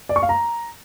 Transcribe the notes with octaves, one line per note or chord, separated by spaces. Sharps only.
D5
C#6
F5
A#5